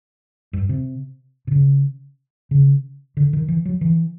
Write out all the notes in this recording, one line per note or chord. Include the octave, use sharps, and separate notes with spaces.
G2
C3
C3
C#3
C#3
D3
D#3
E3
F#3
E3